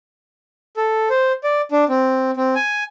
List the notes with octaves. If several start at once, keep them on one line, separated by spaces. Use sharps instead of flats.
A4
C5
D5
D4
C4
C4
G#5